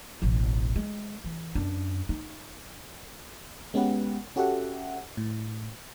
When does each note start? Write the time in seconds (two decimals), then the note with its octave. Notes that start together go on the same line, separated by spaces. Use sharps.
0.22 E1 A1
0.76 G#3
1.25 E3
1.55 F#2 D4
2.09 D#4
3.74 G#3 B3 C#4 G4 B4 F#5
4.36 C#4 F#4 G4 A4 E5 F#5
5.17 A2